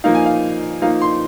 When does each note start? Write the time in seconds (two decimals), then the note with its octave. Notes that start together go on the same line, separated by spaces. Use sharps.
0.04 F3 A#3 D#4 F5
0.15 G#5
0.26 F5
0.82 F3 A#3 D#4 F5
1.02 C6